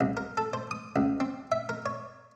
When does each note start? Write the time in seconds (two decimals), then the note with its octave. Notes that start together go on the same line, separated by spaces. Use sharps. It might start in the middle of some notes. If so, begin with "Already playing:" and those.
0.01 C2
0.17 A#4
0.37 A4
0.53 C5
0.71 D#6
0.96 C#2
1.20 C4
1.52 E5
1.69 A#4
1.86 C#5